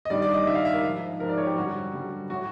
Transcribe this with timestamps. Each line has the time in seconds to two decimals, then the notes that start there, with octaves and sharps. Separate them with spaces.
0.05 D#5
0.10 G2 D#3 G3 D5
0.22 D5
0.34 D#5
0.46 G2 D#3 G3 E5
0.55 F5
0.65 E5
0.74 A#4
0.83 G#2 F3
1.20 F3 A#4
1.24 G#2
1.29 D5
1.38 C#5
1.47 G4
1.57 F#2 D3 G3 F#4
1.93 F#2 D3 G3
2.29 A2 F#3 F#4